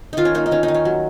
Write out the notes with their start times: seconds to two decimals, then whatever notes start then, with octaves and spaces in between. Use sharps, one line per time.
0.13 D#3 D#4 F4
0.25 C#4
0.35 A#3 D#4
0.46 D#4
0.51 D#3 C#4
0.63 D#4
0.68 D#3
0.74 C#4
0.85 F#3